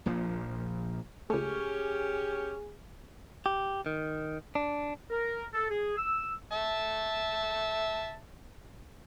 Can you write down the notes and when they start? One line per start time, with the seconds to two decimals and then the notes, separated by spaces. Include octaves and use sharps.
0.06 A#1 A#2 F3
1.30 C#2 A3 C#4 G4 G#4
3.46 G4
3.86 D#3
4.55 D4
5.10 A#4
5.54 A4
5.70 G#4
5.97 E6
6.52 E5 A5